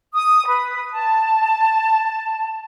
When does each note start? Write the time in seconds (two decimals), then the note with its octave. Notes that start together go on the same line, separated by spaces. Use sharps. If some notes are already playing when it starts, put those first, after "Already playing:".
0.14 D#6
0.47 B4
0.91 A5